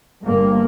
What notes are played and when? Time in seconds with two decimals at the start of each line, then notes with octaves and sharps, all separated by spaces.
0.23 G1 G2 A#3